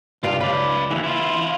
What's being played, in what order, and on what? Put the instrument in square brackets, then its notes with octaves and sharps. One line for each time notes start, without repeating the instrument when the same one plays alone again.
[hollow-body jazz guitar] C2 G2 D5 [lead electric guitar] F4 F5
[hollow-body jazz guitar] C#2 [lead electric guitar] B4 D5
[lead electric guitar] D#2 G#2 [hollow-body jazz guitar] E3
[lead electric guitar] E4 F4